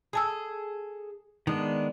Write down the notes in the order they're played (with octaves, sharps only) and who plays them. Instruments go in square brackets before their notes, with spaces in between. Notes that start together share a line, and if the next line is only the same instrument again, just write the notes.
[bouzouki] G#4 A4 [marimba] G#5 A5 E6
[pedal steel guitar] D#3 G#3 B3 [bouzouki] D4 [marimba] D#4